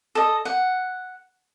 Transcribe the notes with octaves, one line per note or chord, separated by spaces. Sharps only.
A4 D#5
F#5